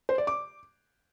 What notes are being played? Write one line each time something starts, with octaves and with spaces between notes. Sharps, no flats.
C5
D5
D6